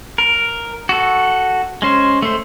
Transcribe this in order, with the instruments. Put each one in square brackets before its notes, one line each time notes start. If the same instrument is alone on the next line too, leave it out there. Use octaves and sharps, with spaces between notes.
[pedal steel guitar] A#4
F#4 A4
G#3 C#4 C5
A3 C5